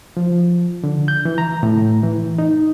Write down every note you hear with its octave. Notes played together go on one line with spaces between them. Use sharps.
F3
D3
G6
E3
A#5
A2
E3
D#4